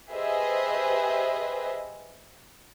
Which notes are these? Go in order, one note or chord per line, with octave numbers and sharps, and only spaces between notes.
G4 G#4 B4 C5 D#5 E5